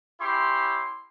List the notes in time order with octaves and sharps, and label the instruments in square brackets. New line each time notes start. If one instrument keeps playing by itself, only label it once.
[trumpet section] C#4 E4 G4 C6